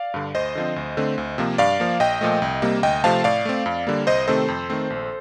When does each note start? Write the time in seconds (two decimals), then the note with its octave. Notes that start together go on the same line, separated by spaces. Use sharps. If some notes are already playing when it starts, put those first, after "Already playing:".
Already playing: D5 F5
0.14 G2 D3
0.35 D2 C5 D#5
0.55 D3 F3 C4
0.76 D2
0.97 D3 A3 C4
1.18 D2
1.38 C3 F3 A#3
1.58 G2 D5 F5
1.80 F3 A#3
2.00 A#1 D#5 G5
2.21 A#2 F3 A3
2.42 C2
2.62 C3 G3 A#3
2.83 D2 D#5 G5
3.04 C3 F3 A3 C4 F5 A5
3.24 A2 D5 F5
3.45 A3 C4
3.66 F2
3.87 D3 G3 A#3
4.07 C2 C5 D#5
4.27 C3 D#3 A3 C4 A4 C5
4.48 F2
4.70 D#3 A3 C4
4.90 A#1